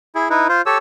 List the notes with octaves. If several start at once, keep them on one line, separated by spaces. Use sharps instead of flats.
E4 G#4
D#4 E4 B4
F4 C5
G4 A4 C#5 E6